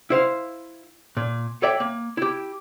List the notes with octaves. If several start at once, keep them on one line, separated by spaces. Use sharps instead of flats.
E4 C5 F5
A#2
A4 C#5 D5 E5 G5
A#3
E4 G4